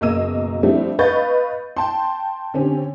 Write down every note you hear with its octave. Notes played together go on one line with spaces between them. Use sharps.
F#1 B2 A#3 D#5 E6 D#7
F3 G3 A3 C4 D4 E4
B4 D#5 F5 C#6 G6 A6
G5 A5 C6
D3 C4 C#4 G4